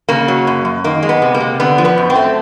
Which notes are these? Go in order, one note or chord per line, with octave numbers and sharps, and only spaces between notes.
C#3 A#3
F#3
F#2
F#2
D#3 A#3
G#3
B3
C3
A#3
C3
D3 B3
F3
B3
F#2
C4
A3